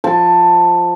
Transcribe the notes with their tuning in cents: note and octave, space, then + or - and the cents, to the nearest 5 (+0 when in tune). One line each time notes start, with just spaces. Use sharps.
F3 +0 C5 +0 A5 +10